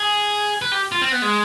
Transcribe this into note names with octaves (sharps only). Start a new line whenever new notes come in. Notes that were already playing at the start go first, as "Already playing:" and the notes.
Already playing: G#4
B4
G4
F4
C4
B3
G#3